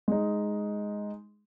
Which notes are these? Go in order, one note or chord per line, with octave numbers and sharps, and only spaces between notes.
G#3 D#4